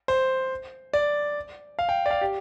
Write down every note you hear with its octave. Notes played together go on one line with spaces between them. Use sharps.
C5
D5
F5
G5
D5
F5
G4